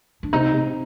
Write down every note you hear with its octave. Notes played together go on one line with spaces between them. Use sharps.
D4
C3 D#4
C3